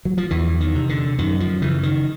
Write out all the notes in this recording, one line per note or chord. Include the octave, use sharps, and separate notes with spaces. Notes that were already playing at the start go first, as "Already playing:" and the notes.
F#3
F3
E2 E3
D#3
C3
D3
F#2 D#3
F3
C#3 E3
D#3